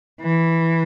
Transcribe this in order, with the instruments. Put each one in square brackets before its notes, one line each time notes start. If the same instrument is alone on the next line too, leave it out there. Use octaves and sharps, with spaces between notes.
[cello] E3